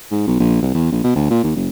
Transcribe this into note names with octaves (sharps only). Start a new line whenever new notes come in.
G#2
B1
A#1
C2
E2
A#1
B2
D2
A#2
D#2
F#1